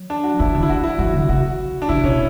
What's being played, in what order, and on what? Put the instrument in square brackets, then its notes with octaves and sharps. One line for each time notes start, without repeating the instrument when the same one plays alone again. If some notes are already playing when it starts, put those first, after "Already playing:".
Already playing: [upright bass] F#3
[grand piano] D4
F#4
[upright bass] E3 [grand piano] E4
[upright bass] D3 [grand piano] D4
[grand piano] E4
F#4
E4
[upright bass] F#3 [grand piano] F#4
[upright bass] D3
[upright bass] C#3 [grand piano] F#4
[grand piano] D4
[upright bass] C#3 [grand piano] E4
[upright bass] B2 [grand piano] C#4